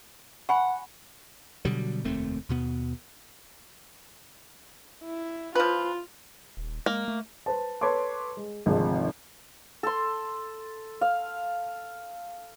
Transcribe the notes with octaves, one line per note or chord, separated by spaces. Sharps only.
F#5 G#5 B5 C#6
B2 D3 F#3 G3
F1 D#2 A3 C4
D#2 B2 B3
E4
F3 F4 B4
D#1
G#3 A#3
A3
B4 C5 A5
A4 B4 C#5 A5 C6 D6
G#3
G#1 D2 G#2 C3 F3 G#3
A4 C6
F5